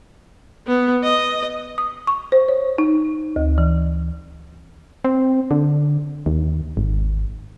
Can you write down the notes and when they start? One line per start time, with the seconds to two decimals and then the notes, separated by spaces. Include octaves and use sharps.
0.67 B3
1.04 D#5
1.78 D#6
2.07 C#6
2.32 C5
2.49 C#5
2.78 D#4
3.36 D2
3.58 E3
5.04 C4
5.51 D3
6.26 D#2
6.77 G#1